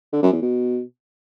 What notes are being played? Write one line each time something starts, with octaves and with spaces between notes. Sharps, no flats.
D3
F#2
E2
B2